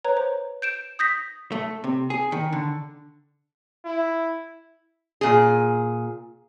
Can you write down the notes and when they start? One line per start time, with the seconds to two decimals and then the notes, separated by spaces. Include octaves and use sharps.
0.04 B4 C#5 A#5
0.17 C5
0.62 G6 D7 E7
0.99 D#6 G6 A#6 B6
1.52 A3
1.84 C3
2.10 G#4
2.32 D#3
2.53 D3
3.85 E4
5.21 A#2 G#4